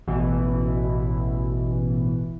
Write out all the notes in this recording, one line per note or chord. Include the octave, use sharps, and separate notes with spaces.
A1 B2 E3